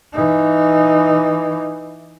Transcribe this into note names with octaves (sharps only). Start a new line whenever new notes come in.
E3 D#4